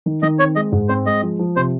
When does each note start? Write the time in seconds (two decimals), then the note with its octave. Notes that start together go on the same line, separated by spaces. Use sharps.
0.06 D#3
0.22 D#3 D#5
0.39 C4 C#5
0.56 G#3 D#5
0.72 G#2
0.89 C4 C5
1.06 G#3 D#5
1.22 F3
1.39 F3
1.56 C3 C5